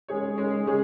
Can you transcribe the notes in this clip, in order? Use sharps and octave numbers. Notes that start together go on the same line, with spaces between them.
G#3 C#4 G#4 C#5
G#3 C#4 G#4 C#5
G#3 C#4 G#4